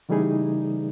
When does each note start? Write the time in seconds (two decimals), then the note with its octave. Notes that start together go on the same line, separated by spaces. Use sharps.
0.09 C#3 E3 G3 A3 D#4 G#4